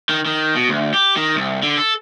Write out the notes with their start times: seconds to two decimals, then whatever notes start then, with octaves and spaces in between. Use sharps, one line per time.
0.09 D#3
0.26 D#3
0.55 B2
0.69 D2
0.94 G4
1.17 D#3
1.36 C2
1.63 D3
1.78 A4